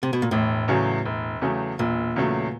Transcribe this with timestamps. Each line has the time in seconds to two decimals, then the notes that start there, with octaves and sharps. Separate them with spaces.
0.03 C3
0.13 B2
0.22 A#2
0.31 E1 A2
0.68 E2 C#3 F#3 A3
1.06 E1
1.42 E2 C#3 F#3 A3
1.79 E1 A#2
2.16 E2 C#3 F#3 A3